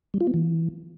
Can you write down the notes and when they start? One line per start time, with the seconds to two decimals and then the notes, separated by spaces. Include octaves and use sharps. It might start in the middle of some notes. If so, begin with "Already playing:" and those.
0.14 G3
0.21 F4
0.27 B3
0.34 E3